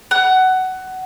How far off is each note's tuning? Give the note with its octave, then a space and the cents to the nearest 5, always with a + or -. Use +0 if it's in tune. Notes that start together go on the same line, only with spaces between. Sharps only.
F#5 +15